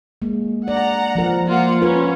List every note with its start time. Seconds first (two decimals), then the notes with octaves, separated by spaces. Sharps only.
0.22 G#3 A#3
0.68 D5 F#5 A#5
1.15 F3 A#4
1.47 A#3 F4 F#5
1.82 C#4 F4 A#4 B4